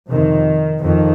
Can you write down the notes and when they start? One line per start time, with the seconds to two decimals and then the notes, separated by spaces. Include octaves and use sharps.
0.10 F2 C3 D#3
0.83 F2 D#3